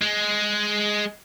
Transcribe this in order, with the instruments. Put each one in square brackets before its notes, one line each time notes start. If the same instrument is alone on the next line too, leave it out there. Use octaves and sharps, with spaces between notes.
[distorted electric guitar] G#3